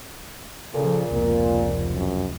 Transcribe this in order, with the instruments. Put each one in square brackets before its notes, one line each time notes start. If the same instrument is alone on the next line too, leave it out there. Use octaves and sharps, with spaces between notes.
[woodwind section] A#2 [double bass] C#3 F3 [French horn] A4
[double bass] F1 C#2 [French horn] A#3
[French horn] F#2